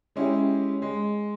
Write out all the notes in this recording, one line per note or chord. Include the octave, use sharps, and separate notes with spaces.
G#3 C#4 E4 G4 G#4
G#3